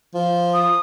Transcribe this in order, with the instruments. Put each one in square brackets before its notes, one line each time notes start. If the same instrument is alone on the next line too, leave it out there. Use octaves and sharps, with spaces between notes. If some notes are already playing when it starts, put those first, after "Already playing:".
[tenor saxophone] F3
[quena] D#6